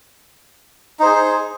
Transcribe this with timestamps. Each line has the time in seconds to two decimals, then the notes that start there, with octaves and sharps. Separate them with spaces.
0.99 D#4
1.02 C5
1.05 G#4